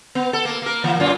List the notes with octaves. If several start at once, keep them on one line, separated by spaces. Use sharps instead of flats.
B3
A4
A#3
A#3 A#4
E3 A#3
F#2 A#2 F4